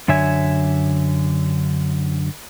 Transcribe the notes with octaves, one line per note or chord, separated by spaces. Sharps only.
F#2 D3 C#5 E5 G#5